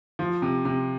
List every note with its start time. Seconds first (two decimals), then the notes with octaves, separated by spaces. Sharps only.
0.19 F3
0.42 C3
0.65 C3